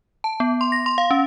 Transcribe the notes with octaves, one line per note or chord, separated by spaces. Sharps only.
A5
B3
C6
A#6
C6
F5
C#4